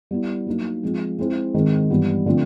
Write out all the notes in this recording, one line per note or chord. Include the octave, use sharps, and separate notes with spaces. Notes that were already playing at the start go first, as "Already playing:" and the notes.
G3 B3 E4
F#3 A#3 D#4
F3 G#3 C4
G#3 C4 E4 G#4 C5
G#2 D#3 G#3 C4
G2 E3 G3 B3
D3 F3 A3 C4